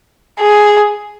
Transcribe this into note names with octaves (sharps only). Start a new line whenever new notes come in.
G#4